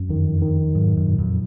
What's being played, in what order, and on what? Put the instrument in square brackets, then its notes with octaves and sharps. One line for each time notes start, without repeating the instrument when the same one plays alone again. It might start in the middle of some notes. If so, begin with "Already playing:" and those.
Already playing: [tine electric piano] F#2
[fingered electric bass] F2 [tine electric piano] D#3
[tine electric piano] D#3
[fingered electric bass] G#2 [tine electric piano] F#3
[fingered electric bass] F#2
[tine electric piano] A#2
[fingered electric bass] F2